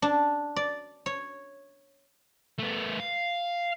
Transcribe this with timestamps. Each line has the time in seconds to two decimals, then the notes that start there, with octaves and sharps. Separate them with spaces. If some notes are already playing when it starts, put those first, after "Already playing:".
0.02 D4
0.56 D5
1.06 C#5
2.59 A3 B3
3.00 F5